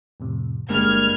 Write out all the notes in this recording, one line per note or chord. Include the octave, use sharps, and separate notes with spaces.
F2 A2 C3
G1 G2 G#3 A#3 F6 G#6